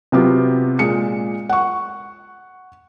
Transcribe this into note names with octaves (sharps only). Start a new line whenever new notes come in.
C3 F#3 B3 F4 G4
A#2 G#3 C#7
F#5 C#6